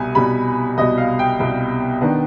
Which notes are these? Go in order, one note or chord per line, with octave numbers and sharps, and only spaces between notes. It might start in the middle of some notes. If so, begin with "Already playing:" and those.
Already playing: C2 B2 G3 G#5
C2 B2 G3 B5
C2 B2 G3 D#5
F5
G5
C2 B2 G3
D#3 B3 D4